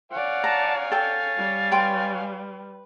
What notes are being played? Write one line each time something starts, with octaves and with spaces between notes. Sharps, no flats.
C#5 D5 F5 F#5 G#5
A5 A#5
A4 G5 A6
G3
B4 G5 C6